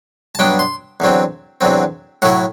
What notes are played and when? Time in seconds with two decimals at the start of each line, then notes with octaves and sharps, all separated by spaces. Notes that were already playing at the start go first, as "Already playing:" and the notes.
0.35 A5
0.39 G2 F#3 B3 D4 G5
0.59 C6
1.00 E2 D3 F#3 C4
1.61 E2 D3 F#3 C4
2.22 A2 F#3 A3 E4 F#5